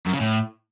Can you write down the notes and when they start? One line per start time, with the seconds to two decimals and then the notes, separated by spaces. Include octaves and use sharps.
0.06 F#2
0.13 C#3
0.21 A2